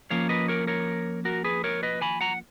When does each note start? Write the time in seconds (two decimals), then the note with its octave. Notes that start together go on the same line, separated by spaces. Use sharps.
0.10 F3 A#3 C#4 C#5 F5
0.29 B4 D#5
0.48 A#4 C#5
0.67 A#4 C#5
1.25 F#4 A#4
1.44 G#4 B4
1.64 A#4 C#5
1.83 B4 D#5
2.01 G#5 B5
2.21 F#5 A#5